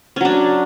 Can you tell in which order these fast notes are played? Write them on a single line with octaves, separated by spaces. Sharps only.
C#4 F#3 D4